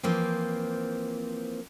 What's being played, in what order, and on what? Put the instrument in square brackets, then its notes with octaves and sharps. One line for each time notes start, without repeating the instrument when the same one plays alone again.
[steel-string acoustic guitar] E3 F3 A#3 C4